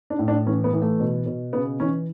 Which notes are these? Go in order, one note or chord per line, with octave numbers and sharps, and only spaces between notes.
D4
A2
D4
E3 C#4
B3
E3
A3
B2
B2
C#3 B3
E3 C#4